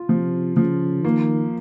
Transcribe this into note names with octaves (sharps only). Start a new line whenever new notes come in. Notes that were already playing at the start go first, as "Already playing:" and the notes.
Already playing: F4
C3 F3
C#3 F3
D#3 A#3